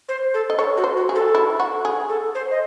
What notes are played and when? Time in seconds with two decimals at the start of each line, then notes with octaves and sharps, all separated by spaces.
0.09 C5
0.34 A4
0.50 D#5
0.59 A4 C#5
0.77 F#4
0.84 C5
0.97 F#4
1.09 G#4
1.15 A4
1.35 E4
1.60 F#4
1.85 G#4
2.09 A4
2.35 C5
2.51 D#5